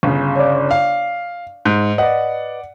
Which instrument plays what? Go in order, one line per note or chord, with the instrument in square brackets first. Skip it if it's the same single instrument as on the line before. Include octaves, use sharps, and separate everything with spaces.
[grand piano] G1 C#3
[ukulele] C#5 D5
[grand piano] F5
G#2
[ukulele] B4 D#5 [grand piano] D5 F#5